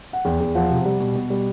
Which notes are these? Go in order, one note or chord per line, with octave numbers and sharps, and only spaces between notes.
F#5
E2 G5
E2
F3 F#5
C3
G3
B2
B2
G3